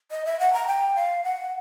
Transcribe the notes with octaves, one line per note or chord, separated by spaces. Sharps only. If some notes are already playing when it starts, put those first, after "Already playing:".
D#5
E5
F#5
A#5
G5
F5
F#5